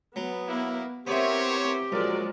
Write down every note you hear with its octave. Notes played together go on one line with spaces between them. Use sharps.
F#3 B3
A#3 E4
B3 C4 E4 G4 A#4 C5 C#5
A#1 F#3 G#3 A#4 D5